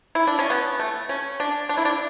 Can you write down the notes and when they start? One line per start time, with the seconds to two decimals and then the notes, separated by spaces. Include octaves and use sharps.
0.15 E4
0.27 D4
0.39 C#4
0.50 B3
0.79 A3
1.09 C#4
1.40 D4
1.69 D4
1.77 E4
1.85 D4